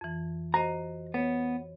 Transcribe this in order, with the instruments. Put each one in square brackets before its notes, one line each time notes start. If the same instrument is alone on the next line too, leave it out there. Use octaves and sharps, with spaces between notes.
[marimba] F2 E3
[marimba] F#4 C5 D#5 [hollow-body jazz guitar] A#5
[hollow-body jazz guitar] B3 [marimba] C#5